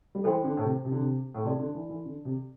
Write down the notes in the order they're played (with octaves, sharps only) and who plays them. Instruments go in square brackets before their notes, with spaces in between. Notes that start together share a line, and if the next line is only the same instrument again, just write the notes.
[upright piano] G3
[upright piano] E3 [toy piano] A4 C5 G5 C6
[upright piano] D3
A2
C3
C3
D3
C3
A2
[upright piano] C3 [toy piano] A4 D5 A5 C6
[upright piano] D3
E3
E3
D3
C3